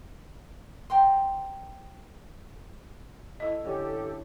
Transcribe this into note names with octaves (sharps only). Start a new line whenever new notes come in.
C5 G5 A#5 C6
A3 E4 D#5 D#6
D3 C#4 G4 A4